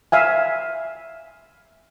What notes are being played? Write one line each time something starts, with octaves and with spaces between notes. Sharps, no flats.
E5 F5 G#5